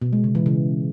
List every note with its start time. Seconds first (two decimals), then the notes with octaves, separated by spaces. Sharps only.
0.02 B2
0.13 G#3
0.24 C#3
0.35 E3
0.46 C#3